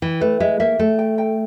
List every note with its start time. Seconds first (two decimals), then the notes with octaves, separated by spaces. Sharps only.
0.02 E3 G5
0.21 A3 B4
0.40 G#3 E5
0.60 A#3 E5
0.79 A3 G5
0.99 G5
1.18 G5